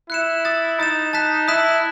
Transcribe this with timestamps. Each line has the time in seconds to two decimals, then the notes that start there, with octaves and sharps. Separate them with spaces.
0.10 E4 F#6 C#7 E7
0.45 D#6 A6 E7
0.79 D#4 D#6 A6 E7
1.13 A5 D#6 F#6 B6 E7
1.48 E4 A5 D#6 F#6 B6 E7